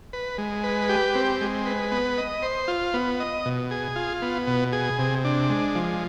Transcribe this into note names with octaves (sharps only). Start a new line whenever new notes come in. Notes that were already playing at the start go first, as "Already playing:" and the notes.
B4
G#3
B4
G4
C4
G#3
B4
B3
D#5
C5
F4
B3
D#5
B2
G#4
F4
B3
B2
G#4
C3
D4
G#3
F3